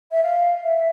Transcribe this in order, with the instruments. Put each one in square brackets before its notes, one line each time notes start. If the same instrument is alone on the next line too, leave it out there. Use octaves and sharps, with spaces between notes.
[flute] E5
F5
E5